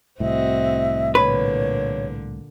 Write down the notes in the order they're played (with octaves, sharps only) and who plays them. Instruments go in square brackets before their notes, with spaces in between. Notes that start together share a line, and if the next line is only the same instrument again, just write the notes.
[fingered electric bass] C2 A2 [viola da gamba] C4 F#4 D#5 [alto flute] E5
[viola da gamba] A#2 D3 [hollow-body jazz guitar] B4 [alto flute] C#5